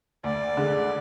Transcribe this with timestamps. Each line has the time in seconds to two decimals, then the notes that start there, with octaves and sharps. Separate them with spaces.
0.24 D2 D5
0.57 D3 G#3